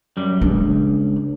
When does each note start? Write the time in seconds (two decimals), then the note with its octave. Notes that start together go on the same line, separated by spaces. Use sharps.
0.17 F#2 G3
0.41 C#2 D4